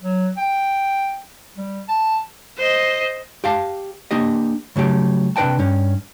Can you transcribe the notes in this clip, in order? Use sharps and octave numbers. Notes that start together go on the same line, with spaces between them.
F#3
G5
G3
A5
C5 D#5
G4 F5 A5
A#3 D4 G4 D#5
C#3 F#3 A3 G4
C3 D4 B4 D#5 G5 A5
G2 C#4